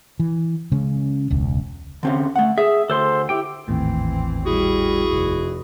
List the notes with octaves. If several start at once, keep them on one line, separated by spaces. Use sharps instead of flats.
E3
C#3 G#3 C#4
E1 C#2
D3 C4 C#4
A3 F#5
G#4 E5
D2 A4 C5 C6
E4 G4 G5
G#1 D#2 A2 E3 C4
G3 E4 F#4 G#4
F1